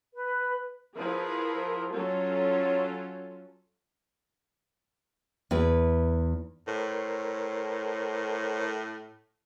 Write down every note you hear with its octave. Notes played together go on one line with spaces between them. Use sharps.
B4
F3 E4 G#4 A#4 B4
F#3 C#4 F4 A4
E2 E4 B4
A2 A#4 C5 C#5